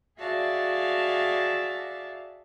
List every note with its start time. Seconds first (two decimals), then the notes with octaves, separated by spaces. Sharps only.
0.19 F#4 G#4 D5 E5 F5 A5